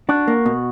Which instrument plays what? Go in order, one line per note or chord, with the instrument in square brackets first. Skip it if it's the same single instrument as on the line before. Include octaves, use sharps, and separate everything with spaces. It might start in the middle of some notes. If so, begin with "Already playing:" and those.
[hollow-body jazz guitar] D4 [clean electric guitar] F#4
[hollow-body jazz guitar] A#3
B2